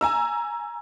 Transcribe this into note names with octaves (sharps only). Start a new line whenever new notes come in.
G#5 A#5 E6